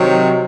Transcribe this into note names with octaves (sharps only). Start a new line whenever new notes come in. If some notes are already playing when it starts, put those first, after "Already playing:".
Already playing: C3 D#3 F#3